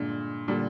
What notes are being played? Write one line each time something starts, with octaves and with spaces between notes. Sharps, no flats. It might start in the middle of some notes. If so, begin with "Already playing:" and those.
Already playing: G2 A#2 D3 G#3
A#2 D3 G3 D4